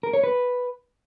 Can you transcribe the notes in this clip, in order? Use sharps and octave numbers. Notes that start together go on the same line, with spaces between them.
A#4
C#5
B4